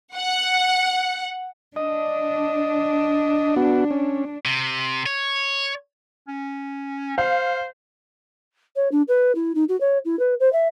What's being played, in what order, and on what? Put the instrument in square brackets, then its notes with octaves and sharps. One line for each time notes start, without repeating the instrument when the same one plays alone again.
[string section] F#5
[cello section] D4 [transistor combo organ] D#5
[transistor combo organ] B3 F#4
C#4
[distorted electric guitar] C3
C#5
[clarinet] C#4
[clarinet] C5 [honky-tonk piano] F5
[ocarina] C#5
D4
B4
E4
D#4
F#4
C#5
E4
B4
C5
E5